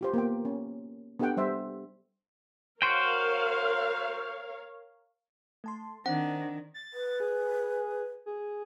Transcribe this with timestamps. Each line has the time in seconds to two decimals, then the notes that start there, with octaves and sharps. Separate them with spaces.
0.01 F4 G4 C5
0.13 A#3 B3 G5
0.45 C#4
1.19 B3 D4 G4 A4 F#5 G5
1.37 G3 C5 E5
2.82 F#4 A#4 C5 C#5 F5 G5
5.64 A3 A5 C6
6.06 D#3 C4 D4 F#5
6.74 A6
6.94 B4
7.20 G#4
8.26 G#4